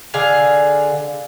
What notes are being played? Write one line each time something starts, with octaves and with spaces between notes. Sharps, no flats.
D3 G#4 F5